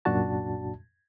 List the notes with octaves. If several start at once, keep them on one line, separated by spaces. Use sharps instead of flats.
C2 F#2 A#2 D4 F#4 A5